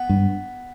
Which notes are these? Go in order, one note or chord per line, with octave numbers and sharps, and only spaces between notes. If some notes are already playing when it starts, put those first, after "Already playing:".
Already playing: B3
G2